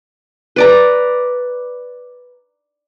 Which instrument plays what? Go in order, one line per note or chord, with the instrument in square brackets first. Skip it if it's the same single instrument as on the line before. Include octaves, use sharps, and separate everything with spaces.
[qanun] B4 D5 A#5